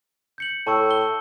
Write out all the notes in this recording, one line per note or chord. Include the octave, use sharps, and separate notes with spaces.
G6 C#7 F#7
A2 A5 C#6 E6
G7